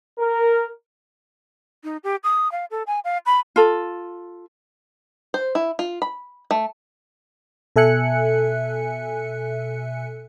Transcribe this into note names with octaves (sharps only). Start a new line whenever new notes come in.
A#4
D#4
G4
D#6
F5
A4
G#5
F5
B5
F4 A4
C5
E4
F4
B5
A3
B2 A4 E5 G#5 F#6 C#7